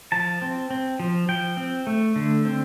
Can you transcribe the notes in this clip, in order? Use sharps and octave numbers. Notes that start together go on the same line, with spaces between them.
F3 A5
C4
C4
F3
F3 G5
C4
A3
D3
C4